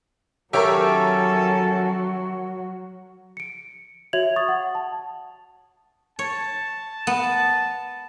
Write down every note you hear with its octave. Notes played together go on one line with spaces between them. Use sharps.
D#3 F#3 C#4 G4 A4 A#4 C#5 E5
C#7 D7
F#4 C#5 E5 G#6 F7 F#7
C#6 D#6 A6
F#5
A5
C#5 A5
B3